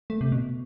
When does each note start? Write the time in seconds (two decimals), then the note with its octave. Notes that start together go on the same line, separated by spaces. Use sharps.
0.10 A3
0.21 C3
0.32 B2